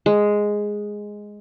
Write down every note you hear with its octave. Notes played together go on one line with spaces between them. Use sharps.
G#3